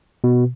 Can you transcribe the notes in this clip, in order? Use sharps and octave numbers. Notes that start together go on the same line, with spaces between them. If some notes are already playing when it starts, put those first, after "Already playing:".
B2